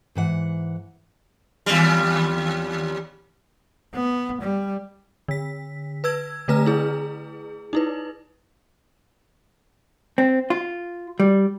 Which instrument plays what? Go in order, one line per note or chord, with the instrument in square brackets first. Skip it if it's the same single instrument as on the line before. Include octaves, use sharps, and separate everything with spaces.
[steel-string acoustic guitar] G#2 E3 F#5
[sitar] D#2 G3
[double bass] B3
G3
[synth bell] D3 B6
B4 E6 G#6
D3 A3 B4 A#5 F6
E4 G#4
D#4 E4 B4
[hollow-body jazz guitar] C4
F4
G3